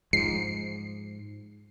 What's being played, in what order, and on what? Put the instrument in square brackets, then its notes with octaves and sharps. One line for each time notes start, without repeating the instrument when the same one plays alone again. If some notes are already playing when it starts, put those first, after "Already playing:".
[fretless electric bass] G#2 F3 G#3 [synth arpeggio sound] C7